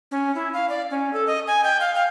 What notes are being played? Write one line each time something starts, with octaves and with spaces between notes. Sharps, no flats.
C#4
E4
F5
D5
C#4
A4
D#5
G#5
G5
F5
F5